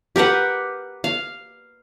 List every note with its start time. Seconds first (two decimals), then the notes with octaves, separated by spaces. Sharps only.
0.16 G4 A#4 B4 F#5
1.04 F5